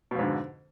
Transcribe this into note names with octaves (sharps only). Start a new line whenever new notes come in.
F2 G#2 B2 D3